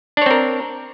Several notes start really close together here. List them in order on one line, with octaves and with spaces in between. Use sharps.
D4 C#5 C4 A#4